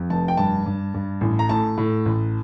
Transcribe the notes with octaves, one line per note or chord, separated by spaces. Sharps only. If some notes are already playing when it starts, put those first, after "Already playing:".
Already playing: F2
F1 A5
G5
G2 A5
G2
G2
A1
A#5
A2 A5
A2
A1